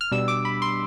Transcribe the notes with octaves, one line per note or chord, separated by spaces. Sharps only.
F6
B2 G3 D4 E6
D6
B5
C6